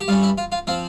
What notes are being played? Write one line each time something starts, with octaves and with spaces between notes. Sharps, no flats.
G4
G2 G3 C#4 F4
E4
F4
F4
F3 C4 F4